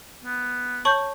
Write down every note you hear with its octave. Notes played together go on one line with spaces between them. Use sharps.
B3
C#5 A5 C#6 G6 F#7